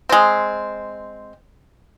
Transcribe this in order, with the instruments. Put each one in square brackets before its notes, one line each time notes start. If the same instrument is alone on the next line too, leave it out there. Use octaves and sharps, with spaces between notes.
[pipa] G#3 C4